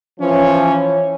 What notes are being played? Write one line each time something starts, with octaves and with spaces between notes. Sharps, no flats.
E3 F3 C#4